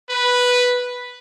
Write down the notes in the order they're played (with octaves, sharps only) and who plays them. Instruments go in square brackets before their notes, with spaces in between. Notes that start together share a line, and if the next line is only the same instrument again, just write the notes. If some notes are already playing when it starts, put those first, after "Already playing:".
[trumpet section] B4